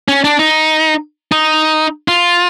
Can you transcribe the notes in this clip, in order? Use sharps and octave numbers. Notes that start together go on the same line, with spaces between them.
C#4
D4
D#4
D#4
F4